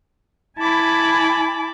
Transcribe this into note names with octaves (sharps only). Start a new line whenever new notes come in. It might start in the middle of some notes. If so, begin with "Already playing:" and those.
E4 G#5 A5 B5 D6